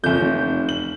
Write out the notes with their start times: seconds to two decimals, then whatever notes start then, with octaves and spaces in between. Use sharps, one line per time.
0.04 F#1 F2 G6
0.20 F1
0.69 F#7